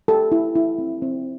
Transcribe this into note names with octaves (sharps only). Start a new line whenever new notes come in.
G4 A4
E4
E4
C4
C4